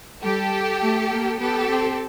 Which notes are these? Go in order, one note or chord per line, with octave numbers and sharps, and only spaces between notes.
G3 G4 A4
A3
A#3
B3 G4 A4
C4